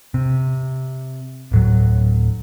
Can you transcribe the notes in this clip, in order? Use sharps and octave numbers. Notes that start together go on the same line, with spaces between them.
C3
D1 A2 F#3